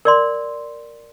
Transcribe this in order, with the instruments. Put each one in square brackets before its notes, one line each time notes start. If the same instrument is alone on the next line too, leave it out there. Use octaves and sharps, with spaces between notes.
[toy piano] A#4 D5 C6